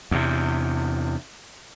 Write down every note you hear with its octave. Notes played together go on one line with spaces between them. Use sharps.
E2 C3